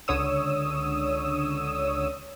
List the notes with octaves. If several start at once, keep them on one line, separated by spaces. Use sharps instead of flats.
C#2 D3 C#5 D#6 E6